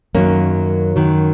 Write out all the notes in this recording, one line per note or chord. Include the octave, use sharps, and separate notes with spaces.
F#2 D#3 F#3 A#3 C#4
F#2 D#3 F#3